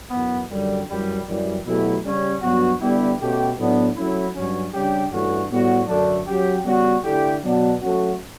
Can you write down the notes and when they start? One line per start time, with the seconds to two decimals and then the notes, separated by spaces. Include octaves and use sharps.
0.10 F#2 E3 B3
0.49 F#2 D3 G3
0.88 F#2 E3 G3
1.27 F#2 E3 G3
1.65 B2 F#3 A3 E4 G4
2.03 C#3 G3 C#4 G4
2.41 G2 F#3 B3 F#4
2.80 D3 G3 B3 E4 G4
3.19 B2 A3 C#4 G4
3.57 A2 F#3 B3 D4
3.96 F#3 A3 C#4 E4
4.33 G2 F#3 C#4
4.72 C#3 G3 D4 G4
5.11 G2 E3 A3 C#4 F#4
5.49 A2 G3 B3 F#4
5.87 F#2 D3 F#3 A3 D4
6.26 F#3 C#4 G4
6.64 C#3 G3 B3 F#4
7.03 D3 A3 E4 G4
7.42 B2 F#3 B3 D4 F#4
7.80 F#3 A3 C#4 F#4